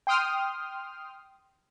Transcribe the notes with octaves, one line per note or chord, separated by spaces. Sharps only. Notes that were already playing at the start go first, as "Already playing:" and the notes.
G5 C6 D#6 F6